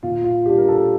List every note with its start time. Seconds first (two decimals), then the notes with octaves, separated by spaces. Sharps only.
0.03 A#2 F4
0.24 F4
0.46 G3 D4 G4
0.58 A#4
0.68 A4